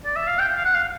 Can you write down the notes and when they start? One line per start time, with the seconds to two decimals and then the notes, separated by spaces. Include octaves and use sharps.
0.05 D5
0.16 E5
0.27 F5
0.39 G5
0.56 F5
0.64 F#5
0.74 F5